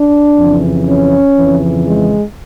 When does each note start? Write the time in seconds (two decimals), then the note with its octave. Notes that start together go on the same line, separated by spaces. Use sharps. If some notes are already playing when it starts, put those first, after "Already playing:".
Already playing: D4
0.38 F2 C#3 E3
0.87 C#4
1.37 F2 C#3 E3
1.87 G#3